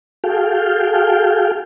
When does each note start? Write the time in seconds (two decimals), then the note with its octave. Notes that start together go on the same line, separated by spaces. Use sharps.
0.24 F#4 G#4 A4 F5 G5